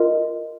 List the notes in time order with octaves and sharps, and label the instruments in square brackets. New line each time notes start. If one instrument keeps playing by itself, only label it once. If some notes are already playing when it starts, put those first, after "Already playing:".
Already playing: [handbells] F4 A#4 D#5